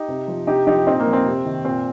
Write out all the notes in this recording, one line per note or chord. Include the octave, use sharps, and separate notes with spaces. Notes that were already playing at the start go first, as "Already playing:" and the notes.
Already playing: D#4 G4
C3
F3
C3 D#4 G4
F3 D#4 G4
A#2 C4 D#4
A#3
F3
C4
C3
D#3
A#2 C4